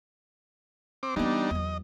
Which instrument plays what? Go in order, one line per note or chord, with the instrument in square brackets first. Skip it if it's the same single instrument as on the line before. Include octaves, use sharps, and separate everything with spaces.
[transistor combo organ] C4 D6
[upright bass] E3 B3 [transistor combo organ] G3 D4 D#4
[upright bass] E2 F#3 [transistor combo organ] D#5